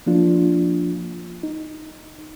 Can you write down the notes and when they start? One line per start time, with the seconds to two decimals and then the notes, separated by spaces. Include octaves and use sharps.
0.06 F3 A#3 D4 F4
1.43 D#4